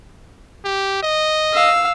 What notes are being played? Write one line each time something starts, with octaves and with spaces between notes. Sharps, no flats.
G4
D#5
F5 E6